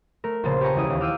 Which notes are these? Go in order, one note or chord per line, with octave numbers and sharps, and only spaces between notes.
A3 A#4
A#1 C#3 C5 A5 E7
G4 B4 C#5 G#5 A#5 C#6
E1 C#2 C#4 E4 D#6
E1 D#2 C7
F5 D6 E6 G6 D#7